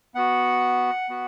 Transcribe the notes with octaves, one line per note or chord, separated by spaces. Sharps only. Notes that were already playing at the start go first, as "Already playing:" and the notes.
B3 F#4 F#5
B3 F#4